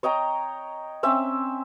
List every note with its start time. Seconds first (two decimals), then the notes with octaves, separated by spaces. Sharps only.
0.03 C#5 D#5 G5 A#5
1.03 C4 C#4 E5